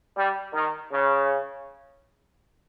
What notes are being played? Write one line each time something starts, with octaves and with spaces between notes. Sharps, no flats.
G3
D#3
C#3